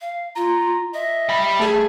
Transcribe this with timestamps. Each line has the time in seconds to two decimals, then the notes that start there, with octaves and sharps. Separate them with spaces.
0.01 F5
0.36 F4 A#5
0.94 D#5 E5
1.29 G3 B5
1.59 A3 G#4 A5